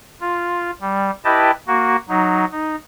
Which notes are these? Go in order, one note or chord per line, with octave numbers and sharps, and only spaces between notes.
F4
G3
E4 G4 B4 D#5 G5 A5
A#3 F#4
F#3 D#4
D#4